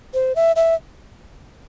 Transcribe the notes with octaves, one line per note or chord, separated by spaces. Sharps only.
C5
E5
E5